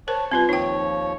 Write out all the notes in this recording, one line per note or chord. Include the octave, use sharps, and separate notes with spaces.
A#4 C5 C#5 A5
C3 G3 C4 F4 B4
D#2 F3 D#4 C#5 G5